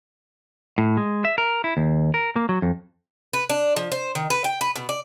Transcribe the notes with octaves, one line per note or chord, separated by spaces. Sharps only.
A2
G#3
E5
A#4
E4
D#2
A#4
A#3
F#3
F2
B4
D4
F3
C5
D#3
B4
G5
B4
B2
D5